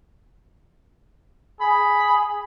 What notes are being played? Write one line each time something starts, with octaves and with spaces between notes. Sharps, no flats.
G#4 B5